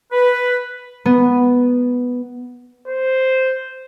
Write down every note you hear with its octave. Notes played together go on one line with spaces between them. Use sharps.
B4
B3
C5